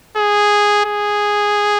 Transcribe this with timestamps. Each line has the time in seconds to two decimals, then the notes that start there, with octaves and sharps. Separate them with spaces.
0.17 G#4
0.85 G#4